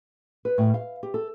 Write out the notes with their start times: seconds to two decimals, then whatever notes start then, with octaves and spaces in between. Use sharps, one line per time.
0.45 B4
0.58 A2
0.74 F5
1.03 G4
1.14 A4